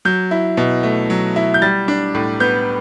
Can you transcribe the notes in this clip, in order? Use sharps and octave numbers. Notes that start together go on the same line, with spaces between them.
F#3 G6
E4
B2
A3
F#3
E4
G6
G3 A6
D4
A2
B3 G6